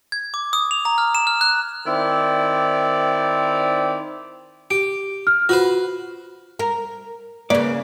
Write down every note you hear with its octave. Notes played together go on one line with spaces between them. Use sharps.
G#6
D6
D#6
F7
A#5
F6
E7
F6
F#6
D#3 C4 E4 D5
G4 D7
F6
F4 F#4 B4 C5
A#4
C#3 A#3 B4 D5